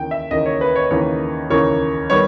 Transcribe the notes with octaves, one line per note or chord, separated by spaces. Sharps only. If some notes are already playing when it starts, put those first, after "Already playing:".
Already playing: D#2 C#3 E3 A#3 G5
E5
D#2 C#3 E3 A#3 D#5
C#5
B4
C#5
D#2 C#3 E3 A#3 C#5
D#2 C#3 E3 A#3 C#5
D#3 G3 B3 C#5